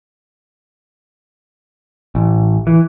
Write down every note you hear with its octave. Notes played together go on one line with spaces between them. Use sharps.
A1
E3